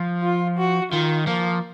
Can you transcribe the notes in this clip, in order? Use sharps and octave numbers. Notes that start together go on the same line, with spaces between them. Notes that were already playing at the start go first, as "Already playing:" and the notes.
Already playing: F3
F4
F#4
D#3 F4
F3 A#3